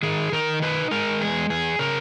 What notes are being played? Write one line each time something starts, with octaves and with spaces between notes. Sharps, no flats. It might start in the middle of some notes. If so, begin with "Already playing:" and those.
D#3 G#4
D#3 A#4
D#4 B4
G#3 A#4
E2 G#4
E2 G#4
C#3 A#4